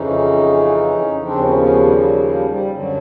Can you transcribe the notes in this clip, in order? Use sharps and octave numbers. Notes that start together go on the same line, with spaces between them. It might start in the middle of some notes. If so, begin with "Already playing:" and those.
Already playing: F2 C#3 E3 C#4 D#4
D#2 C#3 F3 C4 D4
B3 C#4
B3 C#4
G3
F#3
G3
G3
F#2 D3 F#3